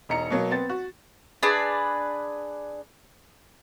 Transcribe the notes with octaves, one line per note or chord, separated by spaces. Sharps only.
E1 D#4 A#5 C#7
B2 F#3 A#3
B3 C4 A6
F#4
D4 G#4 B4 D5